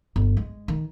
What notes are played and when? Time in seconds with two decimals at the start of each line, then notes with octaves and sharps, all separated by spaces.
0.16 G1
0.37 G#3
0.68 D#3